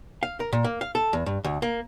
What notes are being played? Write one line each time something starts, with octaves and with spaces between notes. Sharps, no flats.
F5
A#4
A#2
A#3
F5
A4
E2
G2
D2
A#3